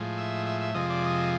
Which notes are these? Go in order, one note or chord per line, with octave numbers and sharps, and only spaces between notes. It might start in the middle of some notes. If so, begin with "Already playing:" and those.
Already playing: A2 F3 G#3
E5
E5
E5
F2 C3 F3 G#3 D#5
D5
D#5